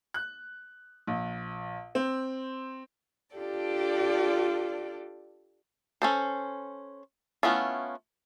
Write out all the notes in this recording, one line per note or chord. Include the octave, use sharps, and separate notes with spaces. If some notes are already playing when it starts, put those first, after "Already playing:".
F#6
A#1
C4
D4 F4 G4 A4 D5
C#4 A4 C5
A3 B3 C#4 E4 F4